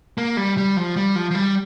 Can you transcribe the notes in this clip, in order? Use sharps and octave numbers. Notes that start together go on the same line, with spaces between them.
A#3
G3
G3
F3
G3
F3
F3
G3